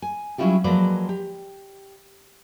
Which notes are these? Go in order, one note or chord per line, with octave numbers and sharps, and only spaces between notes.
G#5
F#3 G3 C#4 E4 F4 G4
F3 F#3 G#3 A#3 B4 D5
G4